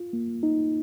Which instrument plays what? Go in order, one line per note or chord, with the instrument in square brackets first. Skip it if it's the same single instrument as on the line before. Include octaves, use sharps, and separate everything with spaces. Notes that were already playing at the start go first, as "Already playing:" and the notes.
Already playing: [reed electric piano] F4
A#3
D#4